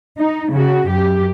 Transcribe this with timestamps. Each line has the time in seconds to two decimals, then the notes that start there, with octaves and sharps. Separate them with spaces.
0.18 D#4
0.51 C#3 F#4
0.88 F#2 G4